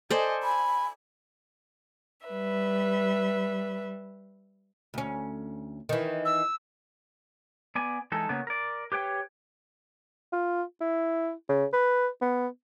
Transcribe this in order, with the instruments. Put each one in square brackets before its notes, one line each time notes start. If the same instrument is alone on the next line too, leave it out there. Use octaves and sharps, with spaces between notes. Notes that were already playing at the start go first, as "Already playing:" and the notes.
[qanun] A4 C5 D5 [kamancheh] D#5 G#5
[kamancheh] G#5 [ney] B5
[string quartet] G3 B4 E5
[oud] D2 C#4
D#3 E3
[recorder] E6
[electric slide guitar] B3 D5 G#5
E3 G#3 D#4 A4
C#3 A#3 B3 C#4
A#4 D5
G4 B4 C#5 G5
[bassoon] F4
E4
C#3
B4
B3